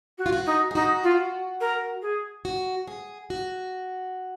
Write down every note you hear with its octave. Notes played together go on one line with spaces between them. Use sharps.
F#4
F4
F#4
D#4
G#4
D#4 F#4
F4
A#4
G#4
F#4
G#4
F#4